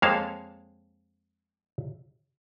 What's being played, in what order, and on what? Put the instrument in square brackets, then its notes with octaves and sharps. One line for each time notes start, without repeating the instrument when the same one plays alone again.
[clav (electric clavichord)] F2 G#3 A#3 C#5 F5 A5